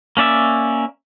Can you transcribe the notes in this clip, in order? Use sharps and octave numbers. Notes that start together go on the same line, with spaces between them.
A#3 C#4 D5 E5